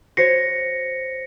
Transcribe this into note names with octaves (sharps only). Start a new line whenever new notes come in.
F#4 C5 C#5 A#6 C7 C#7